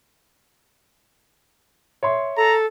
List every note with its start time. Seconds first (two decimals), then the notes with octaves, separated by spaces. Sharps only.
2.03 C#5 E5 C6
2.37 A4 A#5